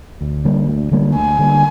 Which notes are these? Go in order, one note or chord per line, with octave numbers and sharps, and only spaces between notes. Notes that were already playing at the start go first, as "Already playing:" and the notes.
D2
D3 G3 A#3
D2
D3 G3 A#3
D2 G#5
D3 G3 A#3